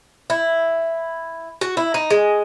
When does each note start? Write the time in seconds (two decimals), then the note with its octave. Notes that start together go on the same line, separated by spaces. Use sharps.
0.30 E4
1.61 F#4
1.77 E4
1.94 D#4
2.10 G#3